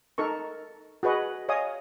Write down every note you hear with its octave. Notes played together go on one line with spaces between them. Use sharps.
D#4 A4 A#4 C#6
F#4 G#4 B4 D#5 C#6
C#5 D#5 F5 G#5 D#6